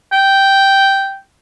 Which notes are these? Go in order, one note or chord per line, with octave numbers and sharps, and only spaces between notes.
G5